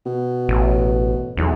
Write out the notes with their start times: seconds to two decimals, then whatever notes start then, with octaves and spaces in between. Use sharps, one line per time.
0.06 B2
0.48 A1
1.37 B1 E2